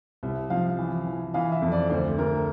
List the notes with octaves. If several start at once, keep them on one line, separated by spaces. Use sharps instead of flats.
C2
F3 F5
E3
E3
E3 F5
E5
F2
D5
D2 C5
D2 A#4